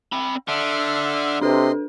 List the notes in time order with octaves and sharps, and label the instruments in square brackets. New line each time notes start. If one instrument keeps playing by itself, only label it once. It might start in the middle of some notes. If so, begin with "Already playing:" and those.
[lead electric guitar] C4 B5
[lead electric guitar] D3 [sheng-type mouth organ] E5 C6 F6
[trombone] C3 [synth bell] D4 A4 B4 [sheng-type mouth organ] D#5 C6